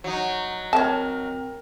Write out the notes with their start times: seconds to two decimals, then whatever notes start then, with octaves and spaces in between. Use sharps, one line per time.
0.04 F#3 D#4
0.73 C4 A#4 C#5 A5 A#5